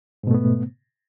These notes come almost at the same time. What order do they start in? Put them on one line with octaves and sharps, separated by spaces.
G#2 B2 A3 B3